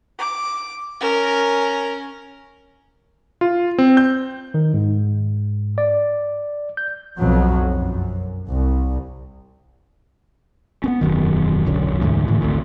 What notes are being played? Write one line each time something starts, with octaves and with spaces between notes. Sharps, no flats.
D6
C#4 A#4
F4
C4
G6
D#3
G#2
D5
G6
B1 F2 B2 F#3
F#2
C2
B3 C#4
E1 F#2 D#3
E1 B1 F#2 D3
D2 G#2 D3 E3
A2 D3 E3
G#1 D2